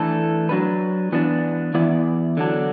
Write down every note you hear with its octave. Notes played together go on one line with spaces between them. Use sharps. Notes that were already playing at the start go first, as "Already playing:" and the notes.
Already playing: E3 A3 D4 A4
F#3 D4 B4
E3 B3 D4
E2 E3 B3 E4 D5
D3 F#3 D4